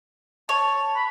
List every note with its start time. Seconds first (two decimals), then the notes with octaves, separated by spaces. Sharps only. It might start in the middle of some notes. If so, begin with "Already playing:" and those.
0.49 C#5 A5
0.96 B5